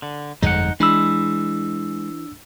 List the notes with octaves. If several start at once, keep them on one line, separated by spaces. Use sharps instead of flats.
D3
G1 F2 G#3 D#4 F#5
E3 G#3 D4 B5 E6